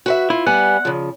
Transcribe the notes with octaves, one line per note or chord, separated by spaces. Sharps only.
F#4 B4 E5
E4 F4
G3 B3 F#5 G#5
C#3 F3